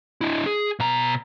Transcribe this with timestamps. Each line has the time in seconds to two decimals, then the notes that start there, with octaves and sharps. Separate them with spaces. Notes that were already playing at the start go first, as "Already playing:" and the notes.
0.21 D4 E4
0.46 G#4
0.80 B2 A#5